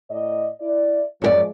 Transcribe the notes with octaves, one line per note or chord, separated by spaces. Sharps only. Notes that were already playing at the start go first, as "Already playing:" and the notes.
A2 D5 D#5
E4 D5
F#2 F3 G#3 G#4 D5